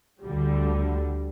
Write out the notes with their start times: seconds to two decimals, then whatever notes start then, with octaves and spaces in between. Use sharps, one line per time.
0.20 D2 D3 G3